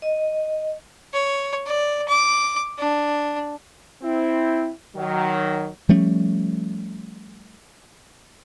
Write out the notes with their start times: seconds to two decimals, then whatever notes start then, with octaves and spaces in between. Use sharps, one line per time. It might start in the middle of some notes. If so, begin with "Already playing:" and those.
0.02 D#5
1.14 C#5
1.66 D5
2.08 D6
2.78 D4
4.03 C4 E4
4.96 D#3 F#3
5.89 F3 G3 A3 C#4